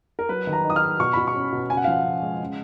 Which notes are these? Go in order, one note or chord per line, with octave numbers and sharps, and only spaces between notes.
A#4
F#3 B4
D#3
A#5
D#4
D#6
F6
D#4
B2 C#6
B2 B5
C#6
C#4
B2
C#3 G#5
F#5
F5
F3 F#5
C#3
G#3
C#3